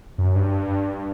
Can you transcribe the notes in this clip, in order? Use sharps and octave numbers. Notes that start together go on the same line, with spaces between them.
F#2
G2